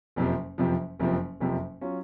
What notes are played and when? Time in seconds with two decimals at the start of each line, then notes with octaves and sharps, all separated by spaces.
0.16 F#1 F2 C3 F3
0.58 F#1 F2 C3 F3
1.00 F#1 F2 C3 F3
1.40 F#1 F2 C3 F3
1.81 F#3 C#4 F4